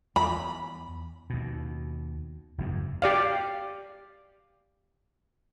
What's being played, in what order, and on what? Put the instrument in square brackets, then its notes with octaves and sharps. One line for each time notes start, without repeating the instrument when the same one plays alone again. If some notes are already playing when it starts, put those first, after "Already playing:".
[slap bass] E2 [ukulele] B5
[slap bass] D#2 B2
F#1 E2 G#2
[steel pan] G4 D5 F5